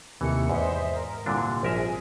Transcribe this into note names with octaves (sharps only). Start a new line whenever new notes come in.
D#2 C3 D#3 E3 A3 C#7
E2 G#2 C5 D#5 E5
A#4
C2 A#2 D3 D4
A#1 F3 G#4 A#4 E5